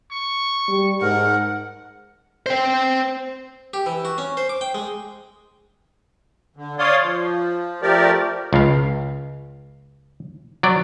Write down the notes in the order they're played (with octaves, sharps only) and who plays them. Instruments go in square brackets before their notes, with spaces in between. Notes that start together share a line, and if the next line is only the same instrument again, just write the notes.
[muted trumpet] C#6
[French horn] G3
[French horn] G#2 [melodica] A#4 [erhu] F#5
[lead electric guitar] C5 G5
[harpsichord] G4
E3
F#4
C#4
C5
D6
G5
G#3
[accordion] D3
C#5 D5 F5 C6 D#6
F3
F3 A3 G4 A#4 D5
[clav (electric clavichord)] C#2 F5
F#3 D5